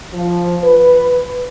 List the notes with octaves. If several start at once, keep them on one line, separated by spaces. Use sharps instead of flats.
F3
B4